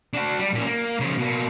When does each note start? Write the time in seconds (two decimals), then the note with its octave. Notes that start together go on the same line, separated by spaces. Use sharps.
0.14 D4 F#4
0.39 G3
0.54 A#2 C#4
0.66 A#3
1.00 C#3 F3
1.17 B2 A#3